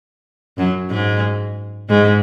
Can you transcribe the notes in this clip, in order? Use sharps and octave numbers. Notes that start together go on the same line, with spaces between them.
F#2 F#3
G#2 G#3
G#2 G#3